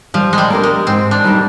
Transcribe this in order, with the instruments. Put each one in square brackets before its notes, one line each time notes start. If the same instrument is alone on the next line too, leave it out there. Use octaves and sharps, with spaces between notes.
[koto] F3 [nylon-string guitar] G3
[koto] G#3
G3
[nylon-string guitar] A#3 D4 G4 A#4
[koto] G#3
[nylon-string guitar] G#2 [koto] C4
[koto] D4
[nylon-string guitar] D#3 G3 A#3 D#4